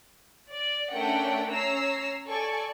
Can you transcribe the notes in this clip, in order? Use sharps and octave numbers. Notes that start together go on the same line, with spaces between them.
D5
A3 C#4 D4 A#4 F#5 G5
C#4 C#5 A#5 E6 C7
A4 D5 G#5 C#6